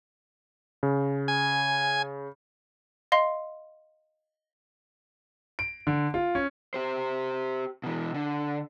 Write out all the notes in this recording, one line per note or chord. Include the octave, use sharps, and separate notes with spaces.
C#3
G#5
D#5 F5 C6
D7
D3
F4
C#4
G4 C5
B2 E3
D3